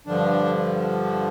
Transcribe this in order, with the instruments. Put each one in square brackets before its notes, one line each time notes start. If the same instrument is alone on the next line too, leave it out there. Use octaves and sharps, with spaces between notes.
[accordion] G2 D3 F3 D4